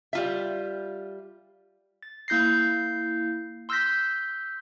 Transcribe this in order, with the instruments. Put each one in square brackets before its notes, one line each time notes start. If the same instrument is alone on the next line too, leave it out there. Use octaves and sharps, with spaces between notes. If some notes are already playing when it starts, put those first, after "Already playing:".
[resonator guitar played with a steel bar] G3 F4 E5
[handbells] A6
A#3 E4 G6 A#6 C7
C6 E6 F6 G6 A#6 B6